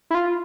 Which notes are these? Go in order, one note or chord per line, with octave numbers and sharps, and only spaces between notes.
E4
F4